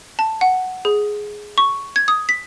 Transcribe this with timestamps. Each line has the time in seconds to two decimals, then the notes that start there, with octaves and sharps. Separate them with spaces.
0.19 A5
0.41 F#5
0.85 G#4
1.58 C#6
1.96 G#6
2.08 D#6
2.29 B6